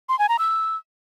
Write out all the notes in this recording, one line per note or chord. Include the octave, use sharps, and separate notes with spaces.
C6
G#5
A#5
E6